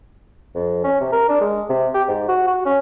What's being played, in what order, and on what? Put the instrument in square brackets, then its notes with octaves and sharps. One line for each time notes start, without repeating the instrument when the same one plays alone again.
[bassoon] F2
C#4
C3
A#4
D4
G#3
C3
G4
G#2
F#4
F#4
C#4